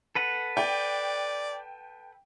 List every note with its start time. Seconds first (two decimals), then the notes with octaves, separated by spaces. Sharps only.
0.15 A4 B4 F#5
0.57 D5 G5